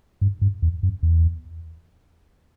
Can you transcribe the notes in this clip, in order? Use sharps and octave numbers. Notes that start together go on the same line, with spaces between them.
G2
G2
E2
F#2
E2